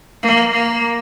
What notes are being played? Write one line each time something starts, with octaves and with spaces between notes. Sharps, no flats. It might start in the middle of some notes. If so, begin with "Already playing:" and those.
A#3
A#3